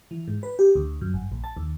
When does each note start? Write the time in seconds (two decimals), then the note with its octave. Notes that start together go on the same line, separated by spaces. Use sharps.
0.11 E3
0.28 G#2
0.43 B4
0.59 G4
0.75 D2
1.01 F#2
1.14 G1
1.32 A#1
1.44 A5
1.57 D#2